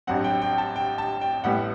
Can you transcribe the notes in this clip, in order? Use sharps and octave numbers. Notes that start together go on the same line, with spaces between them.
A1 G2 F#3 C4 F#5
G5
G5
A5
G5
A5
G5
A1 A2 G3 B3 F#5